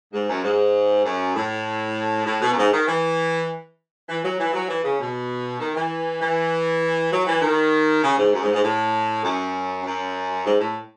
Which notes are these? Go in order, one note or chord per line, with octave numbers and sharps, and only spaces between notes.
G#2
F#2
G#2
F#2
A2
A2
B2
F#2
G#2
D#3
E3
E3
F#3
E3
F#3
E3
C#3
B2
D#3
E3
E3
F#3
E3
D#3
C#3
G#2
F#2
G#2
G#2
A2
F#2
F#2
G#2
A2